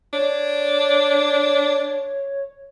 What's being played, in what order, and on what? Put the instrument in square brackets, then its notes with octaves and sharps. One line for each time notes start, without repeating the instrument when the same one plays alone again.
[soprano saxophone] D4 [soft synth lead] C#5